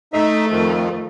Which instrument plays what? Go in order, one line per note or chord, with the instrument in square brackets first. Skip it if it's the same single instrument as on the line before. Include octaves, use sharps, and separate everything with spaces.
[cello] A3 [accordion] D#4 D#5 E5
[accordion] F2 D#3 F3